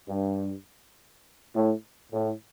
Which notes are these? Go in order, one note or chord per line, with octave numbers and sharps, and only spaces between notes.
G2
A2
A2